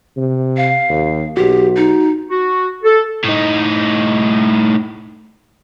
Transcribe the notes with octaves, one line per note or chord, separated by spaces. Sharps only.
C3
F5
D#2
B1 F#4 G4
D#4
F#4
A4
A2 D#4